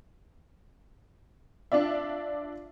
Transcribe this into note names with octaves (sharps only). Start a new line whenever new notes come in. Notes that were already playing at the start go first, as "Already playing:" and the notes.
D4 F4 D5 E5